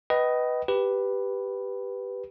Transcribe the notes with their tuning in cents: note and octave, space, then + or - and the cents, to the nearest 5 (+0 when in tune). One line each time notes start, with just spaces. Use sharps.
B4 +0 D#5 +5 G5 -35
G4 +0 B4 +0